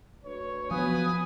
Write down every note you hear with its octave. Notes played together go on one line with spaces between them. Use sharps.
D2 B4 C#5
F3 F#3 B3 B4 G#5 D#6